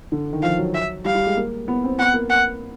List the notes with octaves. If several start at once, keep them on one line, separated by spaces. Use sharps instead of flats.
D3
D#3
F3 F5
F#3
E5
G3 F5
G3
G#3
A#3
B3
C4
B3 F#5
A#3
F#5